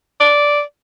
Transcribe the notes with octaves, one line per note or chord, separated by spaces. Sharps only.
D5